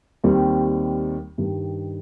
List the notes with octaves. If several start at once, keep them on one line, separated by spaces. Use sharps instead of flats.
D#2 D#3 G3 C4
G2 D#3 G3